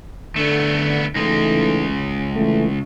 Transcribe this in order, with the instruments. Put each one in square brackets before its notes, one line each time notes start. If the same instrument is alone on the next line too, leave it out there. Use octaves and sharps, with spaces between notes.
[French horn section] D3 [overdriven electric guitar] A3 B3
[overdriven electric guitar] C#2 G#3 [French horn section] E3 A3 D#4
[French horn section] D3 E3 A3